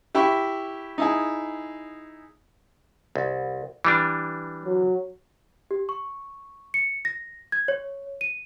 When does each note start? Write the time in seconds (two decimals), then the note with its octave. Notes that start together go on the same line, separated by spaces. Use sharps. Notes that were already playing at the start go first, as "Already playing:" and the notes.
0.15 E4 G4 E5 B5 C#6
0.98 D#4 E4 G#4
3.16 C2
3.85 E3 G3 D4
4.65 F#3
5.71 G4
5.89 C#6
6.74 C#7
7.05 A#6
7.52 G#6
7.68 C#5
8.21 D#7